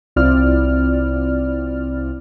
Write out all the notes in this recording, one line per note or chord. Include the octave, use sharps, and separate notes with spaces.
C2 C4 E4 F4 D5 F6